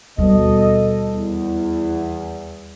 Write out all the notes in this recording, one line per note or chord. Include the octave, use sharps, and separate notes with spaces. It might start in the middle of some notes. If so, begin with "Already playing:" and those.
D#2 B2 G3 A4 D#5
E2